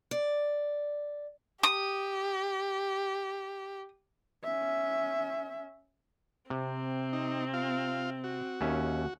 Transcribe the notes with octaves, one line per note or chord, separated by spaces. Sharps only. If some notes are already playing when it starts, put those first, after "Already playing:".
D5
G4 D#6
C#4 E5
C3 C4
D#4
F4 F5
F#4
D#2 C#4 E5